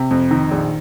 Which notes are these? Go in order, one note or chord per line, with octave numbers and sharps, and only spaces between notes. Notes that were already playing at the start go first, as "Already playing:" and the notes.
Already playing: C3
F2
D#3
A#1